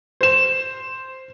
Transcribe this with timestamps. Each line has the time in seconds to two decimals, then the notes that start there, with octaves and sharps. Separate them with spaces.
0.21 C5 E7